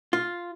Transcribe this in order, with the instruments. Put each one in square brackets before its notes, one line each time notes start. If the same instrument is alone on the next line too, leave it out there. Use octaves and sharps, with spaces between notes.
[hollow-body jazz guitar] F4